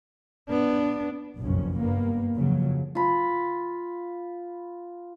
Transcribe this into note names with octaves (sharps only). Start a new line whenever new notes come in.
B3 D4
F#1 B1 F2 C#4
G2 A#3 B3
F2 C#3 F#3
F4 B5